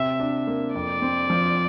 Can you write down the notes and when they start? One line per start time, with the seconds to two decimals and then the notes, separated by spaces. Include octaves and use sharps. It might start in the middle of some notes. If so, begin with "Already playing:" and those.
Already playing: C3 C4 E5
0.20 D4
0.47 A#3
0.75 F2 D5
1.02 C4
1.30 F3